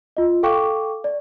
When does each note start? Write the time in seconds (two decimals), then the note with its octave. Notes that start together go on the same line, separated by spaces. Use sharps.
0.17 F4 D#5
0.43 A4 F5 G5 C#6 D6
1.04 D5